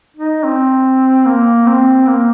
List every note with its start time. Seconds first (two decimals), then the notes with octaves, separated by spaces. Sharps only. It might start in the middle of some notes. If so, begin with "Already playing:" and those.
0.17 D#4
0.44 C4
1.26 A#3
1.67 C4
2.07 A#3